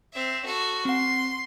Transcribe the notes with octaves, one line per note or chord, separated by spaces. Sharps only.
C4 E5
F#4 A4
C4 F#5 C6